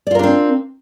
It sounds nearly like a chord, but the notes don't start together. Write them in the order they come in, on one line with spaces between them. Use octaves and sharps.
D5 F4 A#4 D4 C4